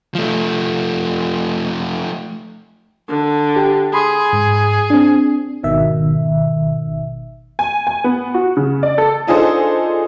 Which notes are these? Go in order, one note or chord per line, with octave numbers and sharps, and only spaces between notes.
F3 A3
D3
G4 G5
G#4 B5 C6 D#6
G#2
C4 D4
G#1 B2 D#3 E5
G#5
G#5
B3
F#4
C#3
D5
A4
D4 D#4 F4 G#4 A4 C5